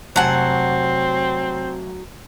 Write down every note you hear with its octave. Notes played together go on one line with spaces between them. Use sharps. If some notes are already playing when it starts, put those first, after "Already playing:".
F1 F#3 C4 F#5 G#5 A5